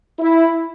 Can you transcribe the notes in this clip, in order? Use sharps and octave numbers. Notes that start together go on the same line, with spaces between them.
E4